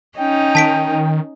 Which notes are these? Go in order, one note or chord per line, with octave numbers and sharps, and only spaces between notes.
C#4 D#4 G5
D#3 A5 B6 D7